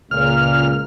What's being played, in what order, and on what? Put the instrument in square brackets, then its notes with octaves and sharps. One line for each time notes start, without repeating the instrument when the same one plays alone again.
[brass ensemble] C#2 A#2 [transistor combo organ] F6